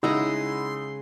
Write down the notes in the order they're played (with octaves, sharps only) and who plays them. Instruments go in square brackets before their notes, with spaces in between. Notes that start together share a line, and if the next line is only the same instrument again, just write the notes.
[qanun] C#3 G#3 A#5 [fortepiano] D#4 [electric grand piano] E4 F#5 E6 [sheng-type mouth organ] C6